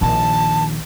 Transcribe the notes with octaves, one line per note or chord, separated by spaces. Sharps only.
A#1 D#3 A5